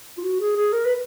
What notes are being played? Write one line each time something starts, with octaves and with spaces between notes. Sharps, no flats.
F4
F#4
G#4
G#4
A#4
B4